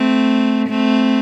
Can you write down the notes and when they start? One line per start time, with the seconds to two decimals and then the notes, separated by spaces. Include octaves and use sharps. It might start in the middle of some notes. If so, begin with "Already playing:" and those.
Already playing: A3 C4
0.69 A3 C4